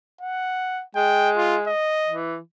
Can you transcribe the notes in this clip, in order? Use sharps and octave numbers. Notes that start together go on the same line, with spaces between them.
F#5
G#3 G5
F4
D#5
E3